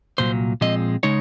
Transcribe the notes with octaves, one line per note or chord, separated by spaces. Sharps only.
C2 A#2 F#3 C5
A#2 F3 G#3 C4 D#5
C#3 G#3 D#4 C#5